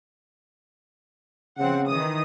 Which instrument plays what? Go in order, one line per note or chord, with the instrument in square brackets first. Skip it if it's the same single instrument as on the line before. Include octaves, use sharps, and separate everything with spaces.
[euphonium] C#3 [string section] F3 C4 F#5
[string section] D#3 E3 D#6